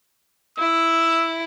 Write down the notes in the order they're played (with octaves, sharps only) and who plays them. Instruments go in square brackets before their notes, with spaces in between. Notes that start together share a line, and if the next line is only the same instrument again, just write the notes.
[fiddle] E4 [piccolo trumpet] E6